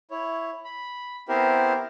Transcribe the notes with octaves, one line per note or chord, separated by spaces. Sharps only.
E4 C#5
B5
B3 C4 E4 G4 A#4 C5